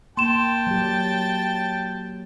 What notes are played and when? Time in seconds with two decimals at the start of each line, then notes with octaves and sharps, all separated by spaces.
0.17 A#3 G5 A5 C6 E7
0.67 F#3 G4